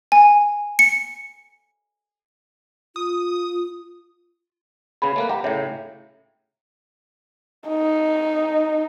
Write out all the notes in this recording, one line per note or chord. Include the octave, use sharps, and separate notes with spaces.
G#5
C#7
F4 D#6
C#3 B3 G#4 B5
A3 A#3 B4
G4 E5 F#5 A#5
A2 C#3 C#5 E5 G5
D#4